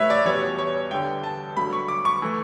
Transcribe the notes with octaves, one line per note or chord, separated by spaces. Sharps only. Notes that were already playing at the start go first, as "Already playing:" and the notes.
Already playing: A2 G3 B4 C#5 E5
D5
E2 B2 G3 C#5
C#5
G2 D3 G3 G5
A5
G2 D3 F#3 A3 B5
C#6
D6
C#6
E3 A3